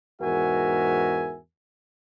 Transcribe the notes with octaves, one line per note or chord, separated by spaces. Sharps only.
E2 G#2 F#4 A#4 E5 G#5